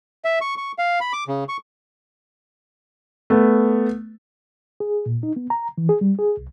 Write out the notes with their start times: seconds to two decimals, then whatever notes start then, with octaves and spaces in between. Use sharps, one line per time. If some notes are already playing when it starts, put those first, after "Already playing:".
0.25 E5
0.41 C#6
0.57 C#6
0.78 F5
1.01 B5
1.13 D6
1.28 C#3
1.49 C#6
3.30 A3 B3
4.80 G#4
5.06 A#2
5.23 D#4
5.36 B3
5.50 A#5
5.78 E3
5.89 G#4
6.01 G3
6.19 G#4
6.37 C2